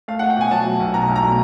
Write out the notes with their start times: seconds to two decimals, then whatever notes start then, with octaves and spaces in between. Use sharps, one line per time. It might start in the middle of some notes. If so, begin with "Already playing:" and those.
0.08 A3 F5
0.19 F#5
0.23 A3
0.30 G5
0.36 B2 G#5
0.51 F#3 A5
0.66 F#3
0.80 B1
0.94 B2 A#5
1.09 B1
1.16 A#5
1.23 A3